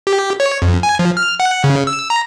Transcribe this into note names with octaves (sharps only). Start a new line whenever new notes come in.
G4
C#5
F2
G#5
F3
F6
F#5
C#3
E6
A#5